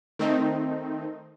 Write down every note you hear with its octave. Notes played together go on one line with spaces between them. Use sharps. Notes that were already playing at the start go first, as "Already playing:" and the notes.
D#3 A3 C4 D#4